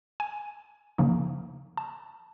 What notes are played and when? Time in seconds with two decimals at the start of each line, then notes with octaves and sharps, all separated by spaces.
0.20 G#5
0.98 C#3 F3 A#3 D#4
1.77 A5